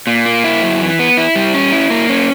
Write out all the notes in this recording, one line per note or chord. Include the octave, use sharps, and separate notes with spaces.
A#2
A#3
E4
F#2
E3
B3
E4
G3
C#4
E4
A#3
C#4